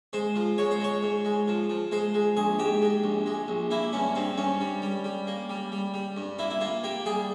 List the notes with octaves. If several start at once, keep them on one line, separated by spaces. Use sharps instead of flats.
G#3 C5
F3
G#3 C#5
C5
G#3 C#5
G#2
G#3
F3
F3
G#3 C5
G#3
A#1 G#4
G#2 G4
G#3
A#1
G#3
A#1
A#3 E4
G2 C#4
G2 C4
G2 C#4
G3
G3
G3
A#3
G3
G3
G3
G2
A#3 E4
E4
A#3 F4
A#3 G4
G3 G#4